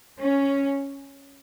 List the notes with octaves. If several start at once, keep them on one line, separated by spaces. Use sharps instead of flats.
C#4